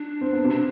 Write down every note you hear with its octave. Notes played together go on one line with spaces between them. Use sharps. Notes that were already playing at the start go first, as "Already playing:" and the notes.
Already playing: D4
C4
B3
C3 C4
D4